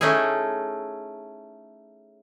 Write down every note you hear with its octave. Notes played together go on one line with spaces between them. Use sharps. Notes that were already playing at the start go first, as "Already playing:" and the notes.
A3 C#4 D#4 E4 G#4